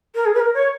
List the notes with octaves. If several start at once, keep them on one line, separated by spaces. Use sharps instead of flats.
A#4
G#4
B4
A#4
C#5